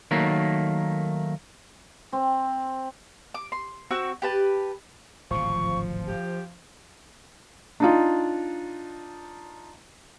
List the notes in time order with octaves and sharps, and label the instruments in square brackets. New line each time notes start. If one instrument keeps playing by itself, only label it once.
[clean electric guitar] D#3 F#3 A3 A#3
[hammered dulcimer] C4
[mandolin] D6
C6
C4 F#4 C#6 E6
G4 B4 A5
[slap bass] D1 G#1 C3 [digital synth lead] F3 [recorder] C#6
[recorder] G4
[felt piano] D4 D#4 F4